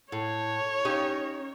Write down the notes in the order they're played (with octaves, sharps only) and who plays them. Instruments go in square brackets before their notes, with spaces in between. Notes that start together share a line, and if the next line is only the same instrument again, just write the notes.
[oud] A2 [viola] C#5
[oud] C#4 D#4 G4